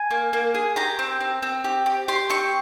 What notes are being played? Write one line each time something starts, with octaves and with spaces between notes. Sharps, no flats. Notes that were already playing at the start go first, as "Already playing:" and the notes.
Already playing: G#5
A#3
A#3
G#4
G4 A#5
C4
C4
C4
G4
G4
G4 C6
C4 C#6